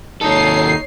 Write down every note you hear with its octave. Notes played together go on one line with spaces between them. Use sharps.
D#2 D#4 A4 C#5 C7